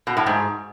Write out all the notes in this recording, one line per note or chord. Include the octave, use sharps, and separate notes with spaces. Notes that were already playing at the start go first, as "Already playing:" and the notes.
B2
A2
G#2